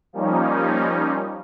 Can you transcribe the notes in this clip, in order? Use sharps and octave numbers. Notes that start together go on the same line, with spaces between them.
F3 G3 A#3 C#4 D#4